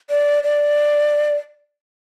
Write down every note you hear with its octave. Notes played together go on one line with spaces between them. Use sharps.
D5
D5